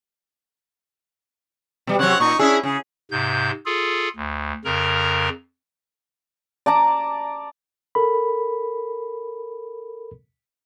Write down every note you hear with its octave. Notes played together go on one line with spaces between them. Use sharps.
B2 G3
C3 F#3 C4 C#5 F#5
A#2 D#4 C#6
C#4 D4 E4 G#4 E5
C#3 G#4
G#2 C3 G6
F4 G#4 A4
D2
F2 C#3 A#4 A#5
D5 A5 A#5 D6
A4 A#4 B5